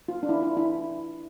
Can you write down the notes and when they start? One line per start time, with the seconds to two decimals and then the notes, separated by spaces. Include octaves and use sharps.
0.08 F4
0.23 D4
0.29 E4
0.43 E4
0.57 E4